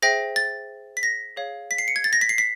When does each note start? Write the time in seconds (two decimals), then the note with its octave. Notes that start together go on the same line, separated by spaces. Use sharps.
0.02 G#4 C5 E5 G5 A#6
0.36 A6
0.97 B6
1.03 A#6
1.36 G#4 C#5 F5
1.71 B6
1.78 C7
1.88 C#7
1.96 G#6
2.04 A6
2.13 A#6
2.21 B6
2.29 C7
2.38 B6